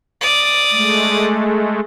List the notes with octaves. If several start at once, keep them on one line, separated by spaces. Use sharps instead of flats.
D5 D#6
G#3 A3